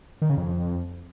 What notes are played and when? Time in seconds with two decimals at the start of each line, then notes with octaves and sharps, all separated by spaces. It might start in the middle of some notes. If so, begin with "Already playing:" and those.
0.22 D#3
0.29 C#3
0.37 F2